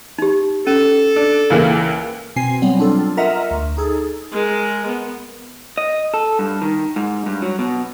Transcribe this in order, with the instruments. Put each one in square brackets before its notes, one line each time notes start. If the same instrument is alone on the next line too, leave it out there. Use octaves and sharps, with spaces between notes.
[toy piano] D#4 G4
[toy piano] C#4 [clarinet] A4
[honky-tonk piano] D4
C#2 E3 A#3
[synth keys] B2 C4 G#5 C7
F#3 G3 B3 C4
D4 F4 A4
F4 A#4 D#5 E5 F#5 A#5
D2
D#4 G#4 A4
[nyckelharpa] G#3 A#4
B3
[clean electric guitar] D#5
A4
G2
D#3
G#2
G2
F#3
B2